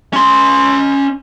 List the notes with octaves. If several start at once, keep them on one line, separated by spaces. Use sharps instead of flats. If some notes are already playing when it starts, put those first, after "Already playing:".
C#4 C6